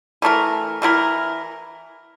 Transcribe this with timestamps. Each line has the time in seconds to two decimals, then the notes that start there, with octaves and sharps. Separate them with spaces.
0.22 E3 A3 E4 A#4
0.82 E3 A3 E4 A#4